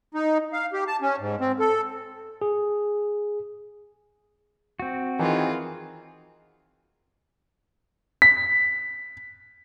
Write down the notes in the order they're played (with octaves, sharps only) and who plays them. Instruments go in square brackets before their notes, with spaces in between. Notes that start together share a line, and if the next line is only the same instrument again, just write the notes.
[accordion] D#4
F5
G4
A5
C#4
G#2
C4
A4
[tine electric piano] G#4
[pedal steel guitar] C4 F#4
[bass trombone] D#3 [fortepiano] E3 [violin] F4 G#4
[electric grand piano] B6